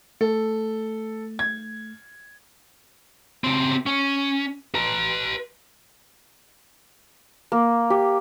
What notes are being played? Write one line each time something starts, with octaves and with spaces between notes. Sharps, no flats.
A3 A4
G#6
C#3 C4
C#4
B4 A#5
A#3
G4